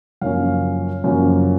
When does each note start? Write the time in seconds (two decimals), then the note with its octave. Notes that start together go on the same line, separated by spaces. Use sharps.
0.21 F#2 C#3 F3 A#3 C#4 F5
1.04 F#2 C#3 F3 A#3 C#4